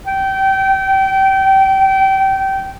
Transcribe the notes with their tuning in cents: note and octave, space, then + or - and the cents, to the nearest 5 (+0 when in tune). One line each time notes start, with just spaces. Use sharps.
G5 -25